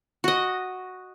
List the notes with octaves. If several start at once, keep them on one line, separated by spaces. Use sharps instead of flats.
F#4 D#5